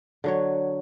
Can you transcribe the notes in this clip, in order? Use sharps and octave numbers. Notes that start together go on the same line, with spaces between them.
D3 F#3 C#5